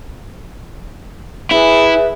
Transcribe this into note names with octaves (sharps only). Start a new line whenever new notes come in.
E4 G#4 B4 E5